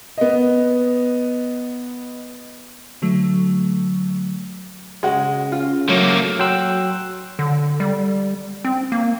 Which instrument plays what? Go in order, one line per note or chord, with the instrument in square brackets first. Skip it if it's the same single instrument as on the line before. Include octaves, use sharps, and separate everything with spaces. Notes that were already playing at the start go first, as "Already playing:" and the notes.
[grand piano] B3 D#5
[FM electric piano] D3 F#3 A3
[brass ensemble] C#3 [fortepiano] G#3 F#4
[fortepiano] F4
[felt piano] F#3 [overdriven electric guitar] A3 A#3
[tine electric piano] F#3 G5 C6 E6 F#6
[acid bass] D3
G3
C4
A#3